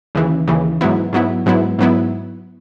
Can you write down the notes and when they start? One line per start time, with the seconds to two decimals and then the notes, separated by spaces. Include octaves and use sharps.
0.15 D#2 C#3 E3
0.47 D#2 C#3 E3
0.81 G#2 F#3 B3 E4
1.13 G#2 F#3 B3 E4
1.46 G#2 F#3 B3 E4
1.79 G#2 F#3 B3 E4